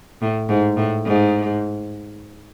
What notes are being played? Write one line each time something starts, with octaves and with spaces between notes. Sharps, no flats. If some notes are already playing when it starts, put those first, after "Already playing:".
A2
G#2
A2
G#2